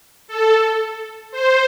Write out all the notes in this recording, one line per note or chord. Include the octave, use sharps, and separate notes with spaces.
A4
C5